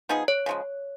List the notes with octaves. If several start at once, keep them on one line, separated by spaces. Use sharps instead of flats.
F3 B3 D#4 G#4
C#5
C#3 F3 G#3